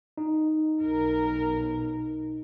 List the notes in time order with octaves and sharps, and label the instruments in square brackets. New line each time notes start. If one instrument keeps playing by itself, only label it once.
[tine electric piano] D#4
[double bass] B1 [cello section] A#4